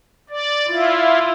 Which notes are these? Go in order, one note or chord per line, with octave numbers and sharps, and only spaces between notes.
D5
E4 F4